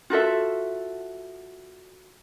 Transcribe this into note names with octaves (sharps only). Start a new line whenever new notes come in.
F4 F#4 A4 E5